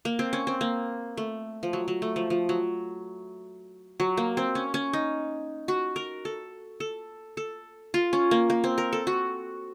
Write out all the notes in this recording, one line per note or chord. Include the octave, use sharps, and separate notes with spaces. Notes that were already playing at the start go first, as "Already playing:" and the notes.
A#3
C4
C#4
C4
A#3
A3
F3
F#3
F#3
A3
F3
F3
F#3
F#3
A#3
C4
C#4
C#4
D#4
F#4
A#4
A4
A4
A4
F4
C#4
A#3
A#3
C4
A#4
A4
F#4